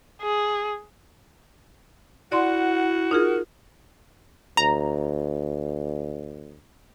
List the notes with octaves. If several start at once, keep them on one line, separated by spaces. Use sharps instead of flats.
G#4
E4 F#4 D5 F#5 C6
D#4 F4 G#4 A#4
D2 A#5